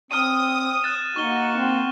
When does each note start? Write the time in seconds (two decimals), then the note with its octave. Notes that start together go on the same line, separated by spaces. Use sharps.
0.11 C4 D#6 F6 D#7
0.83 F#6 A6 E7
1.16 A#3 D#4 F#4 C#6 G7
1.57 C4